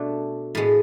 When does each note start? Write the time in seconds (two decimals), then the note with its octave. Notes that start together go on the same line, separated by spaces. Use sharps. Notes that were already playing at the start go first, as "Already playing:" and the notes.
Already playing: B2 A3 D4
0.55 A2 G#3 B3